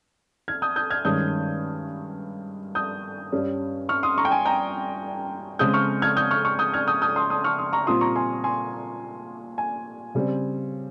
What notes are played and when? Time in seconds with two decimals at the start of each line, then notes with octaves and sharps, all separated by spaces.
0.48 F6 G#6
0.62 D#6 G6
0.76 D#6 G6
0.90 F6 G#6
1.05 G2 D#3 G#3 C#4 D#6 G6
2.75 D#6 G6
3.32 G2 G3 C#4
3.89 C#6 F6
4.03 C6 D#6
4.18 A#5 C#6
4.25 G5
4.32 G#5
4.46 G5 A#5
5.59 C#3 G#3 C4 D#6 G6
5.74 C#6 F6
6.02 F6 G#6
6.16 D#6 G6
6.31 C#6 F6
6.45 C#6 F6
6.59 D#6 G6
6.74 F6 G#6
6.87 D#6 G6
7.02 D#6 G6
7.16 C6 D#6
7.30 C6 D#6
7.44 C#6 F6
7.59 C6 D#6
7.73 A#5 C#6
7.87 A#2 G3 C4 C6 D#6
8.01 A#5 C#6
8.16 G#5 C6
8.44 G#5 C6
9.58 G#5
10.15 C#3 G3 C4